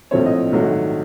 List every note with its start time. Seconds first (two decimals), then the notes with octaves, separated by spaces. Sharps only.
0.11 A#1 A2 F3 A3 C4 C#5
0.26 D#5
0.52 A#1 G#2 D#3 F#3 A3